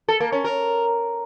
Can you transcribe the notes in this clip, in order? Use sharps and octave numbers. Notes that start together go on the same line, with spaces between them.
A4
A#3
C#4
A#4